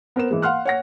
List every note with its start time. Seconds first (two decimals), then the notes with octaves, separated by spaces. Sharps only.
0.16 B3 A#4 C5 E7
0.31 E3 G#3
0.42 F5 F#5 C6 F6 F#6
0.65 C#5 F#5 A#6